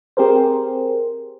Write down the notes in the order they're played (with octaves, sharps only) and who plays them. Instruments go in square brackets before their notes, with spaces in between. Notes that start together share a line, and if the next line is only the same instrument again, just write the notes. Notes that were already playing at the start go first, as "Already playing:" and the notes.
[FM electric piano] C4 G4 G#4 A#4 C5